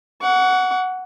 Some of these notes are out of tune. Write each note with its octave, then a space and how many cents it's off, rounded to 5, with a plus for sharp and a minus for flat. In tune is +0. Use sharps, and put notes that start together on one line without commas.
F#5 +0 C#6 +40